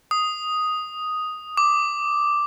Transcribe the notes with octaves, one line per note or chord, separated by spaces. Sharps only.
D#6
D6